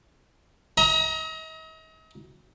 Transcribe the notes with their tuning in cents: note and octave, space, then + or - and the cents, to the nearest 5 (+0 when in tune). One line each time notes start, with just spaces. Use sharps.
D#5 +45 A#5 +25